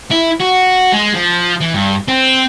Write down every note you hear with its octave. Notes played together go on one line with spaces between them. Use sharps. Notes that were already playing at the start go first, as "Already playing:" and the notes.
E4
F#4
G#3
F3
E3
G2
C4